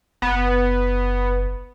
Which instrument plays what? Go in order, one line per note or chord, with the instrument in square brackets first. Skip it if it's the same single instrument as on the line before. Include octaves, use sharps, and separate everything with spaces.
[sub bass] F#1 [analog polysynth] B3